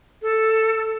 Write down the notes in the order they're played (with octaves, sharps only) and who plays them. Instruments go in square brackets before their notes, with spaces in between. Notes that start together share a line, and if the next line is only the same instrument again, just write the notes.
[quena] A4